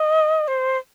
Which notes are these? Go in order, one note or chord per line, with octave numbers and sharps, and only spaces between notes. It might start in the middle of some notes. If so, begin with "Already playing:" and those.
Already playing: D#5
C5